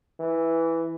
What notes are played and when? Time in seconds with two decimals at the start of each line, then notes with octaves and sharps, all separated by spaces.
0.19 E3